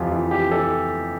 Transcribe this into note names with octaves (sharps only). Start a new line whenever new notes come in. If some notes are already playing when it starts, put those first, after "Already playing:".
Already playing: F2 E3 F4 G4
E3 F4
E3 G4
E3 A4